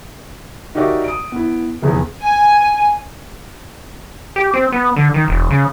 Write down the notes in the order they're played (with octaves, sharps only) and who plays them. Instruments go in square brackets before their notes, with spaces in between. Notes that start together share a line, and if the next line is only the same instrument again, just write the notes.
[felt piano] D#4 F#4 G4 A#4 D5 E5
D#6 D7
B3 E4
F1 E2 G#4
[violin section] G#5
[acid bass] G4
C4
B3
D3
D#3
E1
C#3